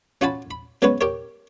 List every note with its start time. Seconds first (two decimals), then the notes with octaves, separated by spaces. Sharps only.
0.21 C#4 F4 F#4 G#5 A5 B5
0.51 B5
0.82 F#3 G#3 B3 C#4 B4 C#5
1.01 G4 A#4 C#5